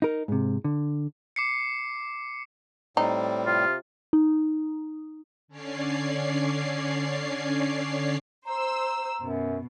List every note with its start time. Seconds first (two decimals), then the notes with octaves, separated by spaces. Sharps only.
0.02 D#4 A#4
0.28 G#2 C3
0.64 D3
1.36 D6 C7 C#7
2.97 A2 G3 C4 D#4
3.46 C3 F4
4.13 D#4
5.48 D3 C#4 C#5 D5 C7
8.46 C5 A#5 E6
9.22 F#2 B2